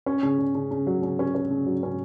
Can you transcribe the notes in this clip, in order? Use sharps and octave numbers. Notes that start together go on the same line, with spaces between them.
C#4
C#3
C#3
C#3
C#3
F#3
C#3
C#4
C#4
C#3
F#3
C#4